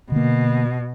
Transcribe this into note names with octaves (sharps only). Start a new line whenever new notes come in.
B2 D3 A#3